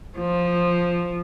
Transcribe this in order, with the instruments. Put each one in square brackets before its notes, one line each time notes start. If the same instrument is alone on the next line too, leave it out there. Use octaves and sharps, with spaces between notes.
[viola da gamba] F3